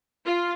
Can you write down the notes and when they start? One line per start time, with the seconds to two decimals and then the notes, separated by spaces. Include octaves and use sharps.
0.24 F4